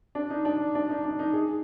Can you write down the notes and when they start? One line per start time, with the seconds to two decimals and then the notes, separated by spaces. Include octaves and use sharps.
0.15 D4
0.30 D#4
0.45 D4
0.75 D4
0.90 D#4
1.04 D4
1.19 D#4
1.33 G#4